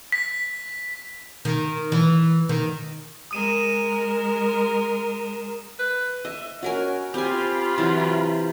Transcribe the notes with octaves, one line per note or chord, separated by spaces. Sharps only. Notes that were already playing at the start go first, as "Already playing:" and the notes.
B6
D#3
E3
D#3
G#3 A#4 D#6 D#7 E7
B4
D#5 E5
C#4 F#4 A#4 G#5
C4 F4 G4 G#5 B5
C3 E3 F#3